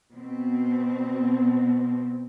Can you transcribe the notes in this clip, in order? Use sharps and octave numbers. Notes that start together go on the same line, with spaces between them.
B2 C4